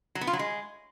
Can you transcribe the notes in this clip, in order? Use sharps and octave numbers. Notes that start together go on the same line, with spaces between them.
F#3
B3
F4
F#3
G#3